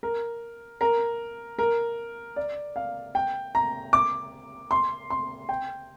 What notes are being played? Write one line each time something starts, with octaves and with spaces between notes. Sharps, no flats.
A#4
A#4
A#4
D5
F5
G5
A#5
D6
C6
C6
G5